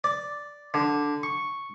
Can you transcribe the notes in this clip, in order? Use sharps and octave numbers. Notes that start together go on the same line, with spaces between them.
D5
D3
C#6